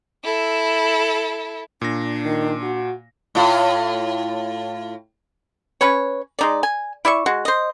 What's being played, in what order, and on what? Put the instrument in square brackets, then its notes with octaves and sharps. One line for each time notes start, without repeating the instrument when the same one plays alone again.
[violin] E4 A4
[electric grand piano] A#2 A#6 [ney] D4
[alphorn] D#3
F#4
[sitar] A2 F4
[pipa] C#4 B4 C#5
G#3 D#4 D5
G#5
E4 D5 E5 C#6
G#3 F#4
C5 D#5